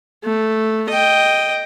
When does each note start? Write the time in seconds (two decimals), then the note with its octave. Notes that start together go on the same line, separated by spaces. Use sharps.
0.24 A3
0.89 D#5 G5